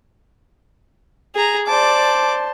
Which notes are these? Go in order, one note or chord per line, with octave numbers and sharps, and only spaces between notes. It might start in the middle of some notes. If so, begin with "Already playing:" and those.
G#4 A#5
C5 D5 A5 D6